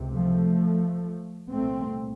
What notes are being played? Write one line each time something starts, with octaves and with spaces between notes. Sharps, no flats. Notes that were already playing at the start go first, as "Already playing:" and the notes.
Already playing: C#2 C3
F3 A3
C2 A#2 A3 C4